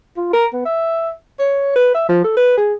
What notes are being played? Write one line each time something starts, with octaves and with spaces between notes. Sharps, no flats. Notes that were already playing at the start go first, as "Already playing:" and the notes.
F4
A#4
B3
E5
C#5
B4
E5
F3
A4
B4
G#4